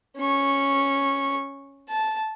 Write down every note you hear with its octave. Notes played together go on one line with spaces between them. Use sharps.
C#4 C#6
A5